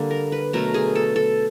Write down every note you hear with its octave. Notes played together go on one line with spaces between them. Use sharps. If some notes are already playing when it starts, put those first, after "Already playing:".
Already playing: D3 G3 A#3
A#4
B4
B2 F#3 A3 A#4
G#4
A4
A4